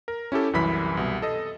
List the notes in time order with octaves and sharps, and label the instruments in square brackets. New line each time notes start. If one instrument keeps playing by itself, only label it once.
[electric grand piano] A#4
C#4 E4 G4 A4
C2 F#2 E3 B5 B6
C2 B2
A4 D#5